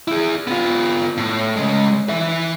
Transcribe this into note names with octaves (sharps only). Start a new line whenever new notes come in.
E4 G#4
B3 F4
A2
C#3 G#3
E3 E5